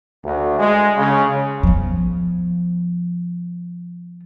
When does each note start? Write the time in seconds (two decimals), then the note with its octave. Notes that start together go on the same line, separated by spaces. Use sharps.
0.25 D2
0.59 G#3
0.98 C#3
1.63 F3 B3